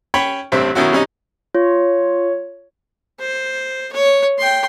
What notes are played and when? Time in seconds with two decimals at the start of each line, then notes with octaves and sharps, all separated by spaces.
0.14 C#4 C#5 G5 B5 C#6
0.52 A1 G2 C4 E5
0.75 B2 D#3 F#3 C#4 E4 F#4
0.92 C3 G3 C#4 D#4
1.55 F4 C#5
3.20 C5
3.92 C#5
4.38 G5 C6